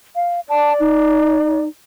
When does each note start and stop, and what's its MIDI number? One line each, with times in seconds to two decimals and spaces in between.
0.16 0.40 77
0.49 1.60 74
0.49 0.73 81
0.80 1.68 63